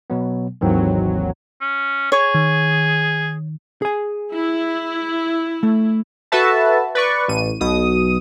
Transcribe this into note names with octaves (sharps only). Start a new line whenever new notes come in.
B2 F#3 B3
G#1 D#2 D#3 E3 F#3 C4
C#4
G#4 C#5
D#3
G#4 G#5
E4
A3
F#4 A4 B4 E5 A5
B4 D5 C#6
A1 D#7
B1 B2 D#6